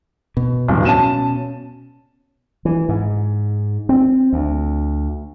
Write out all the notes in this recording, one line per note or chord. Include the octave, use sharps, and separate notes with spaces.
B2
D1 E2 G2
B2 C#4 A5 D#7 E7
E3
G#2
C4
D2